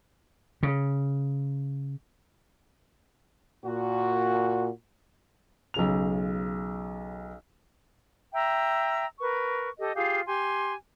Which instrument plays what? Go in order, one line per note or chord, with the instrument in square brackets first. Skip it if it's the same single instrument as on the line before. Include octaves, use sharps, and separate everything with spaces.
[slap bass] C#3
[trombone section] A#2 F#4
[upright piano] B1 C#3 F7
[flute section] E5 G5 A#5 E6
A#4 B4 C#6
G4 A4 D#5
F4 G4 G#4 F5
G4 G#5 C6